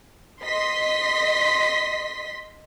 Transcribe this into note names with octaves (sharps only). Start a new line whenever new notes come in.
D#5 C6 B6